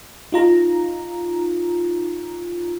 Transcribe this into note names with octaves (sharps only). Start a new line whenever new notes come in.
D#4 F4 A#5